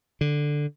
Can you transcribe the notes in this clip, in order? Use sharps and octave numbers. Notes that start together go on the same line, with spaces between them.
D3